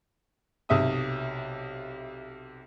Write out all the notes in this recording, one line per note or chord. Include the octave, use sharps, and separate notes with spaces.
B1 C3 E5 D#6